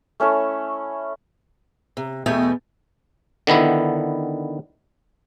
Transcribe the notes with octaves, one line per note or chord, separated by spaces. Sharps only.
A3 C#4 E4 A4
C3
E2 B2 A3 G4 G5 G#5
D3 D#3 B3 E4